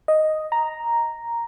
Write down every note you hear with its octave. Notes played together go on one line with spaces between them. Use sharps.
D#5
A#5